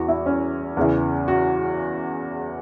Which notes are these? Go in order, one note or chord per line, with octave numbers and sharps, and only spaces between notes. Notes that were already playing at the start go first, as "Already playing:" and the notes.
Already playing: E2 E3 F#4
E4
C#4
E2 C#3 E3
F#4